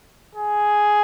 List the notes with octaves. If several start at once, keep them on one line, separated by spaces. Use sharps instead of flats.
G#4